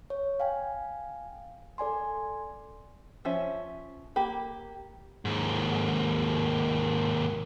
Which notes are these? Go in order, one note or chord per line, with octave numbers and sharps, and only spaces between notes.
C#5
F5 G5 G#5
A4 D5 G#5 C6
F3 C#4 E5
A#3 G4 B5
D#2 G#2